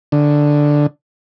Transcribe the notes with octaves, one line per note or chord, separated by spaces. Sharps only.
D3